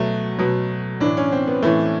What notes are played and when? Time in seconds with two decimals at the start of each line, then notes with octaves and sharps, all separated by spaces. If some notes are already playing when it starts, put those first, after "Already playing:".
Already playing: B2 F#3 A3
0.39 B2 F#3
1.00 A2 E3 D4
1.17 C#4
1.32 C4
1.48 B3
1.62 A2 E3 A3